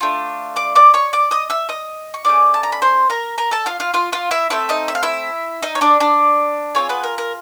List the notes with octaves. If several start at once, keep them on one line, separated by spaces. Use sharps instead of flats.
A3 D4 F4
D5 D6
D5 D6
C#5 C#6
D5 D6
D#5 D#6
E5 E6
D#5 D#6
C#6
A3 C#4 E4 G#4 D5 D6
A5
A#5
B5
C5 C6
A#4 A#5
A#4 A#5
A4 A5
F4 F5
F4 F5
F4 F5
F4 F5
E4 E5
A3 C4 E4 A4 E5
D#4 D#5
E5
F5
E4 E5
D#4 D#5
C#5
D4 D5
D4 D5
C4 C#4 F4 G#4 C#5
B3 B4
A#4
A#4